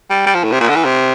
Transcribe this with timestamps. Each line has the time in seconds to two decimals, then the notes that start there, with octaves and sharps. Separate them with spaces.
0.10 G3
0.26 G3
0.34 F3
0.43 A2
0.51 C3
0.60 A#2
0.69 D3
0.76 E3
0.85 C3